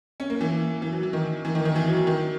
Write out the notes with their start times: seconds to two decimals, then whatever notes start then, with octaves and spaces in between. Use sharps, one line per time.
0.20 C#4
0.30 A#3
0.41 E3
0.82 E3
0.92 F#3
1.03 E3
1.13 D#3
1.45 E3
1.55 D#3
1.65 D#3
1.76 E3
1.86 F#3
1.97 F#3
2.07 D#3